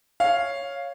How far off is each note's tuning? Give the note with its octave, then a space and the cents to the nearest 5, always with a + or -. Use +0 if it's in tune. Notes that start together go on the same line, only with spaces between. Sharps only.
C#5 +0 F5 +0